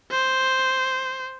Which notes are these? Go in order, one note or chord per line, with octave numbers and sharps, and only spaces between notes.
C5